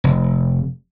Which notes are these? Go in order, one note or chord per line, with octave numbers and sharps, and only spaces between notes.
F1